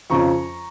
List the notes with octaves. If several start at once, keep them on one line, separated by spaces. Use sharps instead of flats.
F2 C#3 F3 A#5 C#6